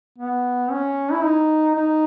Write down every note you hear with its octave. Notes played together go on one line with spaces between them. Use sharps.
B3
C#4
E4
D#4
D#4